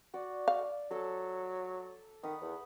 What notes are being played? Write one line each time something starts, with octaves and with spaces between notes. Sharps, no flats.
F#4 D5
F5
F#3 A4 A5
D#3 F#5 B5 D#6
E2